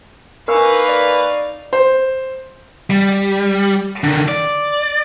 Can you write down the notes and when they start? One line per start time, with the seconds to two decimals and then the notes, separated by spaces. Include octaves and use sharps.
0.48 A#3 D#4 A#4 B4 F5 G#5 C#6 E6
0.88 D5
1.73 C5
2.90 G3
4.04 D3 D#3
4.29 D5